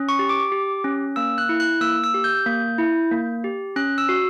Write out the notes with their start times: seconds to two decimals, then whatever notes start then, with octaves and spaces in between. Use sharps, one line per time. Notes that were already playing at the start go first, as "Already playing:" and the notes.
Already playing: C#4
0.09 C#6
0.19 G4
0.29 D6
0.52 G4
0.84 C#4
1.16 A#3 E6
1.38 F#6
1.49 E4
1.60 F#6
1.81 A#3 E6
2.04 E6
2.14 G4
2.24 G6
2.46 A#3
2.78 E4
3.11 A#3
3.44 G4
3.76 C#4 F#6
3.98 E6
4.09 F#4